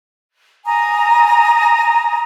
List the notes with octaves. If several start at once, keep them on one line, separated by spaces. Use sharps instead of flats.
G#5 A#5 D#6